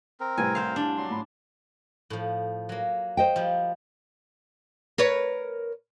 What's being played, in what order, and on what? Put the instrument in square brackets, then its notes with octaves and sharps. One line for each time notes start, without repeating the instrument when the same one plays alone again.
[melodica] C4 A#4
[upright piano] C2 A2 B4 [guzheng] G#5
[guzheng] C5 F5
D4
[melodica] F#3 C6
[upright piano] A2 B5
[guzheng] A2 F3
F#3 A#3
[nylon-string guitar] C5 D#5 G5
[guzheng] F3 G3
[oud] A#4 B4 C#5